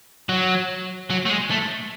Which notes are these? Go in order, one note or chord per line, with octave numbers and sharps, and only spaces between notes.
F#3
F#3
A3
G#3
A3